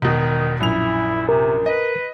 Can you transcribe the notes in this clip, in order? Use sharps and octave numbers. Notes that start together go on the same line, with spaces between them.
E1 B2 D#3
A#1 F#2 E4 F7
C3 A#4
B4 D#5